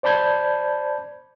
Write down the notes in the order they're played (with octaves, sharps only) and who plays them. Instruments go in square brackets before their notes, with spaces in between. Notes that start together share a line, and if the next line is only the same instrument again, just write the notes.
[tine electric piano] C5 D5 A5 B5 G6 G#6